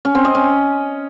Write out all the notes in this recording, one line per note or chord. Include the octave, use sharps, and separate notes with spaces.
C#4
C4
D#5
C#4